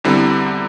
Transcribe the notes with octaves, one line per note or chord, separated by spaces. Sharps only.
E2 D3 G3 C4 E4